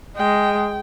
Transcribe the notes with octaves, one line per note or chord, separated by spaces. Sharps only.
G#3 G5